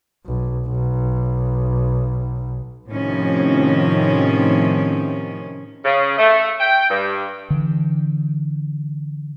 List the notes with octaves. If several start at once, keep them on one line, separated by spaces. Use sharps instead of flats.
B1
B1
A2 C3 D#3 F3 C#4
C#3
A3
G5
G2
D3 E3